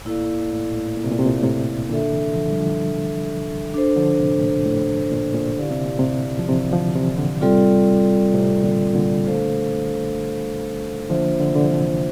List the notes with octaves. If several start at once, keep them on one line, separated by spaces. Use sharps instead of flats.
A2 A#3 E4 A4 D5 F5
A2
A#2
A2
A#2
C3
A#2
C3
A#2
A2 C3
A#2 D3 D4 A4 E5
C3 E3
D3 F3
G3
D3 F3
D4 A4 C5
D3 F3
A2 C3
A2
A#2
A2
G2
A#2
A#2
D3 E4 G4 D5 F5
C3
A#2
A2 C3
F3
C3 E3
D3 F3
C3 E3
A#2 D3
A2 C3 G3 C4 F4 A4 D5
A2 C3
A#2 D3
A#2 D3
A3 D4 A4 C5 F5
D3 F3 A#3 D4 F4 C5 E5
D3
C3
A#2 D3
F3
C3 E3